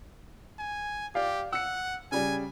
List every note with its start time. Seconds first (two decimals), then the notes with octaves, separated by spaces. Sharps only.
0.59 G#5
1.15 G4 D5 F5
1.52 F#5 E6 C#7
2.12 C#3 G3 G#5